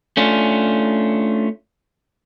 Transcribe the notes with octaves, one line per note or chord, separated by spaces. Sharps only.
A3 C#4 D4 F4